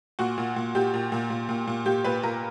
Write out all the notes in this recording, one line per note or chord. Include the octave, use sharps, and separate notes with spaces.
A#2 F#4
A#2
A#2
A#2 G4
A#2
A#2
A#2
A#2
A#2
A#2 G4
A#2 B4
A#2 A#4